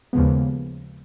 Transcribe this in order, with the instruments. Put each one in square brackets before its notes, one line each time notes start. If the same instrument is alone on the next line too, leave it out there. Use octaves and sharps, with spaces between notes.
[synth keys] D#2 C#3 F3 G#3 B3